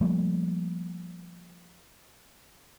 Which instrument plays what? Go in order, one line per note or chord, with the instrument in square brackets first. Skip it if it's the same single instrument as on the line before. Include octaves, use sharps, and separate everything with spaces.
[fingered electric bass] F3 G3 A3 A#3